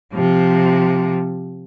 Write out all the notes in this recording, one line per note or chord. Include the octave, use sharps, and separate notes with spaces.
C3 F3